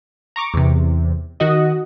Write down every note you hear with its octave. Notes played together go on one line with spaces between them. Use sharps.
A#5 C#6 D6
E2 C3
D#3 F#4 D#5